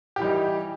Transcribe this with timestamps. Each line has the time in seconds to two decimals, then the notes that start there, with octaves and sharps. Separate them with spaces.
0.16 G4
0.19 E3
0.22 G3
0.24 D#4